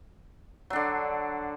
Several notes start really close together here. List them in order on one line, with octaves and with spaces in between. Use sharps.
F#3 D4 D3